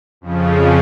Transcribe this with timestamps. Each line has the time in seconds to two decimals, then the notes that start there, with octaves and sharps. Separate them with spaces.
0.21 F2 C#3 F3